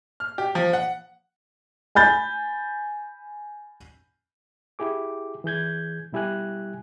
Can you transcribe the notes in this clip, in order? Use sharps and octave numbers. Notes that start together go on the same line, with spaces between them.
F6
G4
F3
F#5
G#5 B5 G6 A6
E4 G4 G#4 D6
E3 G#4 G6 G#6
B2 G3 E4 G4 G#5 F#6